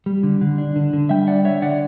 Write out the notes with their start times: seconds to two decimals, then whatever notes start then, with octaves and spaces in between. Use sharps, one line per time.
0.06 G3
0.23 D3
0.41 D3
0.58 D4
0.76 D3
0.93 D3
1.09 G3 E5 G5
1.27 D4 D5 F#5
1.44 D3 C#5 E5
1.62 D3 D5 F#5